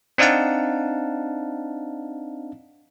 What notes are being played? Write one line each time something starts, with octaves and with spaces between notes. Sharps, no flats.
C4 D4 D#4 F5 F#5 A5